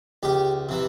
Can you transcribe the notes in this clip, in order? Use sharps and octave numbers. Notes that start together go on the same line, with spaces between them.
C#2 G4
C3 E3